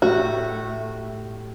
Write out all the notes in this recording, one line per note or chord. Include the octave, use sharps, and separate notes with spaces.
A2 A3 F#4 G4 E6